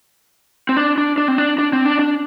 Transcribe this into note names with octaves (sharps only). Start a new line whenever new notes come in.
C4
D4
D4
D4
C4
D4
D4
C4
D4
D4